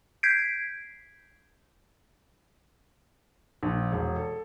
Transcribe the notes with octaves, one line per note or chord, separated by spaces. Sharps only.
G6 G#6 B6 C7 D7
A#1
E1
A4